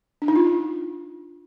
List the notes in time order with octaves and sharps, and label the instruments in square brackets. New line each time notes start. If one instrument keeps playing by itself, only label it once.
[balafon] D4
D#4
F4